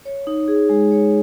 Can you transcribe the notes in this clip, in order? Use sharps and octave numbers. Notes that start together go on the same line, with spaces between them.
C#5
D#4
G#4
G#3
C#5